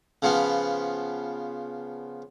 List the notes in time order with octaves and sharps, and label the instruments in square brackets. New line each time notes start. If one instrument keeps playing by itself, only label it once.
[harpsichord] C#3 F3 B3